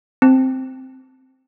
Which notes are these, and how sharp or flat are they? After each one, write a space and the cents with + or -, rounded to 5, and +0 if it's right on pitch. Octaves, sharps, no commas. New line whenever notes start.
C4 +0 A5 +5